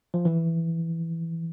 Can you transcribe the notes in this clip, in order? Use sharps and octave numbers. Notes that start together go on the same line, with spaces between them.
F3
E3